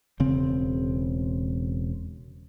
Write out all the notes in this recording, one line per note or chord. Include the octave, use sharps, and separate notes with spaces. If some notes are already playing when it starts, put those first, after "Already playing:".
E1 C#3 C4